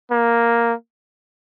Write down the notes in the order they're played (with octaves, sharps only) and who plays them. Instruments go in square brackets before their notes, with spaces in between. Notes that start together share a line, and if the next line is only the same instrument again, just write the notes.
[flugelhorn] A#3